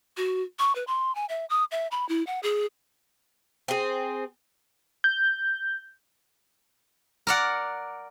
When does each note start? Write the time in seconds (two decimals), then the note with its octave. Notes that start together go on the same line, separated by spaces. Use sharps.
0.17 F#4
0.59 C#6
0.75 B4
0.87 C6
1.15 G#5
1.29 E5
1.50 D#6
1.71 E5
1.91 B5
2.09 E4
2.27 F#5
2.43 G#4
3.68 C4 G#4
5.04 G6
7.27 A#4 D5 F#5